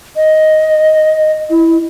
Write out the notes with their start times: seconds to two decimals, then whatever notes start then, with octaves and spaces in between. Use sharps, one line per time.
0.16 D#5
1.50 E4